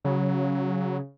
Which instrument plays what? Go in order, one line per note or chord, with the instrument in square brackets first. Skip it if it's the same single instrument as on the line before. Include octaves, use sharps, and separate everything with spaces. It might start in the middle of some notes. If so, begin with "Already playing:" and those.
[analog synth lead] C#3 [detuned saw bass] F#3